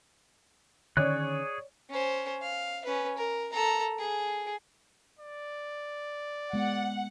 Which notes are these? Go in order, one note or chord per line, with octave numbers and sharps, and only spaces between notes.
D3 D#3 C#4 G#4 C#5 D5 C#6 F#6
C#4 C5
F5
C#4 B4
A#4
A4 A#5
G#4
D5
G#3 B3 F#5